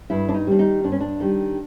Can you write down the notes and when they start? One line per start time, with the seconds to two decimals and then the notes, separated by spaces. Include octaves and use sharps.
0.10 G2 E4
0.29 D4
0.34 D#4
0.47 D#3 G3 D4
0.59 D#4
0.84 G2 D4
0.92 C#4
1.00 D4
1.20 D#3 G3